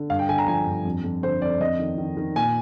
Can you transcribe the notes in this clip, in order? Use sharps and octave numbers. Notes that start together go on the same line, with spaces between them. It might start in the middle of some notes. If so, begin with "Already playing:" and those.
Already playing: D3
G2 F5
G5
D3 G#5
A#5
F3 G#5
G2
F2
F2
D3 C5
F2 D5
F2 D#5
D#3
D#3
D#3
A#2 G#5